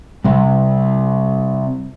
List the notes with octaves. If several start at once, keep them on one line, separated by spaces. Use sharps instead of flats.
C3 G3